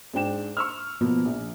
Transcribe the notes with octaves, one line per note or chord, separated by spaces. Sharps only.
G#2 D4 G5 E7
C#6 E6 F6
B2 F3 A#3 B3
A#1